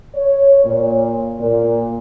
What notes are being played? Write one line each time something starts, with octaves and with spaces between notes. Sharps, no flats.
C#5
A#2
A#2